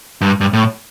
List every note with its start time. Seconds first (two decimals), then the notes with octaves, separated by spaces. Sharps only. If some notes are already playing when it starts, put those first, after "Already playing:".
0.21 G2
0.40 G2
0.53 A2